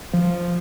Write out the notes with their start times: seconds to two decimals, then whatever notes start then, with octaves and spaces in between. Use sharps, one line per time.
0.14 F3